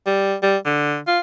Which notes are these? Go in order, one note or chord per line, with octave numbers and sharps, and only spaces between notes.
G3
G3
D3
F4